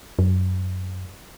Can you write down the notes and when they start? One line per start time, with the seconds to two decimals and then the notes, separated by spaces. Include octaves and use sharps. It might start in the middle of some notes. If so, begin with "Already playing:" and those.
0.19 F#2